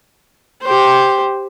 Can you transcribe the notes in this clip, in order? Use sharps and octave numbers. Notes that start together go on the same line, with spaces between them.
G4 C5